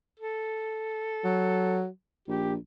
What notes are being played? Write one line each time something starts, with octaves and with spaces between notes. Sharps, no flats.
A4
F#3
A#1 G4